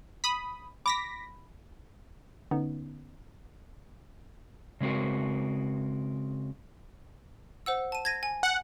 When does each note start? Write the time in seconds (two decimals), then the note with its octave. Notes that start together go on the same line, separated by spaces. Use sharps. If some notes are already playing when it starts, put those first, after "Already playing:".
0.24 B5 D#6
0.86 B5 D6 A#6 B6
2.51 D3 B3 C#4 D#4
4.81 C#3 G#3 C4 F#4 A#4
7.66 C5 F#5 E6
7.92 A5 D#7
8.05 G#6 A#6 D#7
8.23 G#5
8.43 F#5